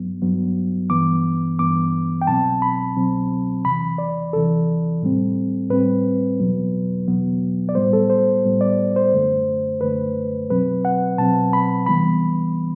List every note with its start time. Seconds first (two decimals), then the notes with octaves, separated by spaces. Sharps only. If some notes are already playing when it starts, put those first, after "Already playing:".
Already playing: G2 F#3 B3
0.22 G2 F#3 B3
0.90 G2 E3 B3 D6
1.59 G2 E3 B3 D6
2.22 G5
2.27 C2 B2 F#3 C4 A5
2.62 B5
2.96 C2 B2 F#3 C4
3.65 E2 C3 E3 B5
3.98 D5
4.33 E2 C3 E3 A4
5.02 A2 G3 C4
5.70 A2 G3 C4 B4
6.39 E2 B2 F#3 B3
7.07 E2 B2 F#3 B3
7.69 D5
7.75 A2 G3 B3 C5
7.93 A4
8.10 C5
8.45 A2 G3 B3
8.61 D5
8.96 C5
9.13 F#2 D3 A3
9.81 F#2 D3 A3 B4
10.49 B2 F#3 C4 B4
10.85 F#5
11.18 B2 F#3 C4 A5
11.53 B5
11.86 C2 C3 E3 G3 B3 B5